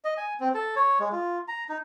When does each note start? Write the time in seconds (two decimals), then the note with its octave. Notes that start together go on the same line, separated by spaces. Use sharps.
0.05 D#5
0.17 G#5
0.40 C4
0.55 A4
0.76 C#5
1.00 G#3
1.12 F4
1.48 A#5
1.69 D#4